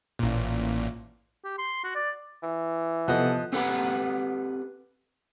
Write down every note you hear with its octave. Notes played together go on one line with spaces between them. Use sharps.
A1 A#2
G4
C6
F#4
D5
E3
C3 F3 B3 A4 D#5 F#5
C4 G4 A4 B4 F#5 B5